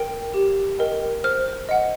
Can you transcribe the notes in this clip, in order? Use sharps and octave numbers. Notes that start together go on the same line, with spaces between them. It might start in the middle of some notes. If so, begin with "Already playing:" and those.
Already playing: A#4 G5
G4
A#4 D#5 G5
C5 F6
D#5 F#5